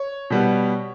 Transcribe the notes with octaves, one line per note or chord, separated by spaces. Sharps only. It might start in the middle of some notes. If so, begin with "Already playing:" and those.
Already playing: C#5
B2 G3 B3